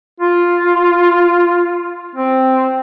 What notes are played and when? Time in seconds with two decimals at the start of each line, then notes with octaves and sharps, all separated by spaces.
0.20 F4
2.15 C4